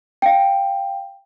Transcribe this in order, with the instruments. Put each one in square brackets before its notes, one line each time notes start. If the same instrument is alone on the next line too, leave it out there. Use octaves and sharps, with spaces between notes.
[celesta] F5 G5